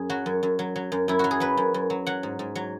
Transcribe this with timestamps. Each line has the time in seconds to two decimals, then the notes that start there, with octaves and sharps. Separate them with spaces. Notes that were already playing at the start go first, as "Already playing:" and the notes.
Already playing: F#2 G#4
0.10 F#3 F#4
0.26 F#2
0.43 F#2
0.59 F#3
0.76 F#3
0.92 F#2
1.08 F#2 E4
1.19 F#3 F#4
1.31 G#4
1.40 F#3 B4
1.57 F#2
1.74 F#2
1.90 F#3
2.07 F#3 F#5
2.23 G#2
2.39 G#2
2.55 F#3